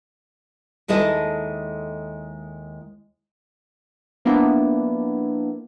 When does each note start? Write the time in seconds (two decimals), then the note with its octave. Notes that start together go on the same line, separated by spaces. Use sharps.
0.88 D#2 G#3 E4 A4 D#5
4.25 F3 A#3 B3 D4 E4